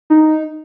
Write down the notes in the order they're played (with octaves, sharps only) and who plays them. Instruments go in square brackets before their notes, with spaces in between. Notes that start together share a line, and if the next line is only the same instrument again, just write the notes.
[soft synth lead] D#4